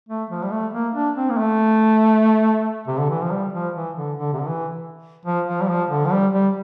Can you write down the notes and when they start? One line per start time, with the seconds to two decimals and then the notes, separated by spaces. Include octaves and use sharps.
0.09 A3
0.30 F3
0.44 G3
0.52 A3
0.73 A#3
0.95 D4
1.16 C4
1.30 A#3
1.38 A3
2.88 C3
2.98 D3
3.10 E3
3.21 F3
3.32 G3
3.53 F3
3.75 E3
3.97 D3
4.17 D3
4.33 C3
4.40 D3
4.47 E3
5.25 F3
5.48 F3
5.62 G3
5.69 F3
5.90 D3
6.06 F3
6.12 G3
6.34 G3